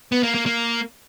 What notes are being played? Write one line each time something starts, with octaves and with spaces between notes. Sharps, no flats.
B3
A#3
A#3
A#3